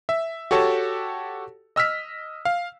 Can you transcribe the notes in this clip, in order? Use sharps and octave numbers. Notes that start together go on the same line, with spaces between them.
E5
F#4 G4 A4 C#5 A5
D#5 E6 F6 B6
F5